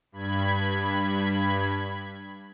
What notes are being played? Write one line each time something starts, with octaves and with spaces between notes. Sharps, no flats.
G2 B5 G#6